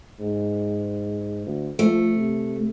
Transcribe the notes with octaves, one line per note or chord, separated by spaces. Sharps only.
G#2
D2
F3 A3
C3